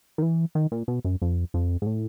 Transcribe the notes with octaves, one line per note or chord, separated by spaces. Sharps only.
D#3
E3
D#3
A#2
B2
F#2
F2
F2
G#2
A2